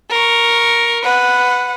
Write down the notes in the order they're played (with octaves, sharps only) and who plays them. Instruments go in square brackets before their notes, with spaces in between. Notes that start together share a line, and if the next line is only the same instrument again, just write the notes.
[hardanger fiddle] A#4 C#6
[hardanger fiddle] B4 [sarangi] F#5